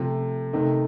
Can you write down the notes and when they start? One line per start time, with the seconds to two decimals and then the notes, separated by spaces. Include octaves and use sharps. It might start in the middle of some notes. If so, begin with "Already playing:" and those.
Already playing: C3 F3 A3
0.53 C3 D#3 A3 D#4